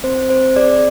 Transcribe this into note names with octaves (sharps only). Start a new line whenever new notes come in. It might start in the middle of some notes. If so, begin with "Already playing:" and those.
C4 C5
C4 C5
G#4 D5